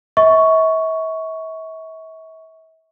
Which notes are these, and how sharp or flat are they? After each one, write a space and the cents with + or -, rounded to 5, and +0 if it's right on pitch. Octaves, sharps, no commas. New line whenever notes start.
E5 -40 C#6 +10